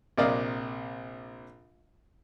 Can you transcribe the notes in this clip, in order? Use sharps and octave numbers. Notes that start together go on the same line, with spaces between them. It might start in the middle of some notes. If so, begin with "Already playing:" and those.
A#1 C3 A#4 D5 D#5 F5